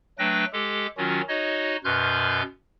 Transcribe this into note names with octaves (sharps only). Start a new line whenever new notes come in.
F#3 A3 D4 B4 G5 A#6
G#3 G4 A4
D#3 F#3 C#4 F4 F#4
D#4 F#4 C#5 D#5
F#2 B2 B4 C6 F6 G6